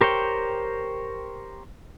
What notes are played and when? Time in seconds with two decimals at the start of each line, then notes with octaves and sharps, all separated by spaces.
0.01 G4 A#4 C5 C#5 G5